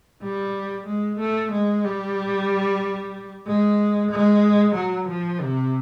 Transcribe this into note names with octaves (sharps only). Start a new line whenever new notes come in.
G3
G#3
A3
G#3
G3
G#3
G#3
F#3
F3
C3